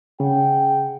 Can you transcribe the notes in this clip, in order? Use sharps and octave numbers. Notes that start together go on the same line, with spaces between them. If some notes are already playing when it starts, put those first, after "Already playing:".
C#3 G#4 F#5 G5